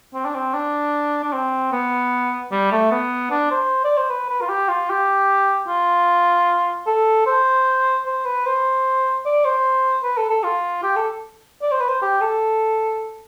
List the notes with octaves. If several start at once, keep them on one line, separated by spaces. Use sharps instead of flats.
C4
D4
C4
D4
D4
C4
B3
G3
A3
B3
D4
C5
D5
C5
B4
B4
F4
G4
F4
G4
F4
A4
C5
C5
B4
C5
D5
C5
B4
A4
A4
F4
G4
A4
D5
C5
B4
C5
G4
A4